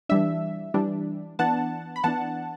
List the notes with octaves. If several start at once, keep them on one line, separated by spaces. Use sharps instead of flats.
E3 G3 D4 E5
E3 G3 D4
E3 B3 D4 F#5 A5
B5
E3 B3 D4 F#5 A5